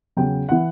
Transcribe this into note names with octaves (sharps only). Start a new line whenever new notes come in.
E2 C#3 F#3 G5
E3 F#5